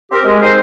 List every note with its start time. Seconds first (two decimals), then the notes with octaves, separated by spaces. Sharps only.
0.10 C4 G4 A#4
0.25 G#3
0.40 C4 D#4 G#4 C5